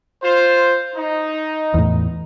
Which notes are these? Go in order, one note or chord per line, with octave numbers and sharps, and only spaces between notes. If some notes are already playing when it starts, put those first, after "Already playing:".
F4 C5
D#4
E2 A2